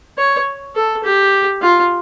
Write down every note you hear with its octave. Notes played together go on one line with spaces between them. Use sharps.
C#5
A4
G4
F4